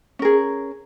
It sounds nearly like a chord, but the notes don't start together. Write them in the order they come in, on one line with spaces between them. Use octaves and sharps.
C#4 A#4 G#4